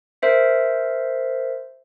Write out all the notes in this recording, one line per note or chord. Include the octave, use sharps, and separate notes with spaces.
A#4 C5 E5 C7